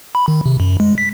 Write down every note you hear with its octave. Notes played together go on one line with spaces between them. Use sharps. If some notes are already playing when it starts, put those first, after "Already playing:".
B5
D#3
C3
F#2
G#3
B6